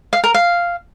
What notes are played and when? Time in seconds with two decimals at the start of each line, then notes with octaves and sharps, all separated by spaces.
0.13 F5
0.24 A#4
0.34 F5